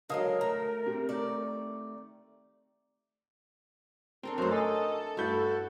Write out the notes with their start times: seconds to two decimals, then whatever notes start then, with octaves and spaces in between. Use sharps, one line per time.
0.10 D3 F#3 G#3 A#4 D#5 F5 D#6
0.41 A3 A#5
0.86 C3
1.09 D#3 A3 D5
4.23 C4 D4 A4 A#4
4.38 F#2 F#3 A3 A#4 C5 C6
4.51 A4 D#5 G#5 D#6
5.17 G2 A3 E4 F#4 B5 G6